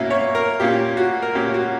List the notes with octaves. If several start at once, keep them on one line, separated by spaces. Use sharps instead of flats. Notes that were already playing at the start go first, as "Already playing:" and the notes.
Already playing: B2 A#3 C#4 E4
C#5
A#4
A#2 A#3 C#4 G4
F#4
A#4
A#2 A#3 C#4 G4
F#4